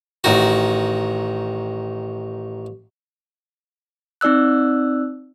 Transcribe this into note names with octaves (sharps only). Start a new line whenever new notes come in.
A1 D#3 F#4
C4 D#4 D5 E6 F#6